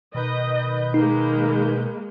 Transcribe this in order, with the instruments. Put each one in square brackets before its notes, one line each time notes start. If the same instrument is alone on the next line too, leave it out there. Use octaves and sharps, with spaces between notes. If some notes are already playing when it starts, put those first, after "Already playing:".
[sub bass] B2 [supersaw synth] D#3 B4 G6 [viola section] D#5
[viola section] G#3 A#3 [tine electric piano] D#4